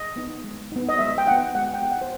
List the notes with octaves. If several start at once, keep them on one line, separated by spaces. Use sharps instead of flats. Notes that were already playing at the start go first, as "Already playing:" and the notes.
Already playing: D#5
B3 D#4
G#3
B3 D#4
D#5
G#3 E5
G5
B3 D#4 F#5
G#3 F#5
G5
B3 D#4
F#5
C5